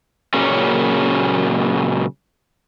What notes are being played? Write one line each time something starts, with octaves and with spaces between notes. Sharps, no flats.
A#2 C#3 F#3 A#3 C#4